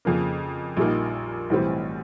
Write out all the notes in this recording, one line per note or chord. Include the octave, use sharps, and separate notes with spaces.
F2 C#3 F3 A#3
A#1 A#2 G3 A#3 D#4
B1 A2 E3 G3 C4